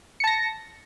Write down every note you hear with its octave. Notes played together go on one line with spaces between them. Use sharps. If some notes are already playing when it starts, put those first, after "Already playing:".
A5 A#6 C#7